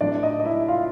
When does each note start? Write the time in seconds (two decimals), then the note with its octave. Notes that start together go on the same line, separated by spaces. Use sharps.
0.01 A2 F#3 A3 D4 D5
0.23 D#4 D#5
0.40 D#5
0.45 E4 E5
0.68 F4 F5